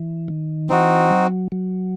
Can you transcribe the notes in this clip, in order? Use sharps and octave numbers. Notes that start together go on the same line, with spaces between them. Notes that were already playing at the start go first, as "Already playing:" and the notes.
Already playing: E3
D#3
E3 C4 D#4 F#4
F#3
F#3